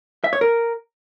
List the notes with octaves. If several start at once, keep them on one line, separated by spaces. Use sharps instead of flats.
E5
C#5
A#4